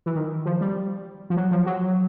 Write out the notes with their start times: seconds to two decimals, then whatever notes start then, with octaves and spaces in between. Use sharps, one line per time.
0.06 E3
0.16 D#3
0.46 F3
0.61 G3
1.30 F3
1.37 F#3
1.51 F3
1.66 F#3